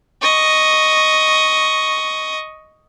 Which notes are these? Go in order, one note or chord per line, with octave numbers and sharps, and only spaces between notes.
D#5 C#6